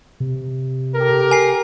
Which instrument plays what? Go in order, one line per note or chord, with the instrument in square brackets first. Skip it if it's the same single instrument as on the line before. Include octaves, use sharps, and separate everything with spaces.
[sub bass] C3
[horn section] G4 A4 A#4
[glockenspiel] G#5 C7